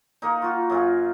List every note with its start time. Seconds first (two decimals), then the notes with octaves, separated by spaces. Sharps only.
0.22 A#3 D#4
0.42 F4 F#4
0.70 F#2 F4 G#4